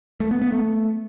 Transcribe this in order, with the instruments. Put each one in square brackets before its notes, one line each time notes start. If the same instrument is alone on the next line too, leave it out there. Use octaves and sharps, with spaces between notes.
[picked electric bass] A3
B3
B3
A3